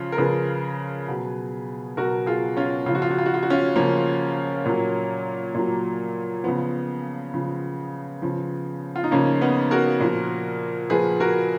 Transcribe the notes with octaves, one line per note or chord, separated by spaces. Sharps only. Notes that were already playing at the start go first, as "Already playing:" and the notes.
Already playing: C#3 F3 F4
A#4
C#3 F3 G#4 B4
B2 F#3
B2 F#3 F#4 A#4
F4 G#4
C#4 F4
C#3 F3 F4 F#4
F4
F#4
F4
F#4
F4
F#4
C#4 F4
C#3 F3 A#3 C#4
A#2 F#3
A#2 F#3
C#3 F3 B3
C#3 F3
C#3 F3
F4
D#4
C#3 F3 A#3 C#4
B3 D#4
F#4 A#4
A#2 F3
A#2 F3 G#4 B4
F#4 A#4